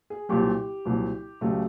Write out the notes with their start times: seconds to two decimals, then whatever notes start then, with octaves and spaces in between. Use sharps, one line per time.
0.10 G#4
0.29 C2 A#2 F#3 G4
0.85 C2 A#2 F#3
1.41 C#2 C#3 F#3 A3 G4